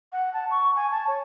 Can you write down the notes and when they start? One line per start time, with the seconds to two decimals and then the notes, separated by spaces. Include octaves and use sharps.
0.12 F#5
0.33 A5
0.50 C#6
0.75 G#5
0.90 A5
1.07 C#5